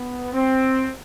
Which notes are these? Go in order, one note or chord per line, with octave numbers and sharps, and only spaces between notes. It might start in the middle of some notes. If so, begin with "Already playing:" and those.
Already playing: B3
C4